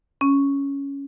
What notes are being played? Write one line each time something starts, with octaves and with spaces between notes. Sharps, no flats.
C#4